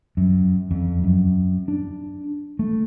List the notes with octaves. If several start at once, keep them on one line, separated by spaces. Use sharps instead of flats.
F#2
F2
F#2
D4
A3